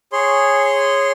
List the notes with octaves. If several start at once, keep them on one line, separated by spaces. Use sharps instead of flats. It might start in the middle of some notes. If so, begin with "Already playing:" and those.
G#4 C#5 C6